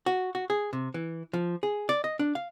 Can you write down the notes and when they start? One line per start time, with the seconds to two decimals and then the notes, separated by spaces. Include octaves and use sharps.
0.06 F#4
0.35 F#4
0.50 G#4
0.73 C3
0.94 E3
1.33 F3
1.63 G#4
1.89 D5
2.04 D#5
2.19 D4
2.35 F5